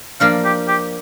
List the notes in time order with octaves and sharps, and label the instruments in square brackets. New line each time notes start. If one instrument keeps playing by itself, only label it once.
[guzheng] F3 A#3 D4 [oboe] F5
[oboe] G4
G4